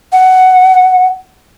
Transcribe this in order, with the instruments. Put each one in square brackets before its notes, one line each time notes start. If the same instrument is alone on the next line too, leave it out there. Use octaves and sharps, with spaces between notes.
[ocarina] F#5